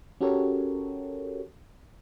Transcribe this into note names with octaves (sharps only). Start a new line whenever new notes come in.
C#4 F#4 G4 A4 A#4 C#5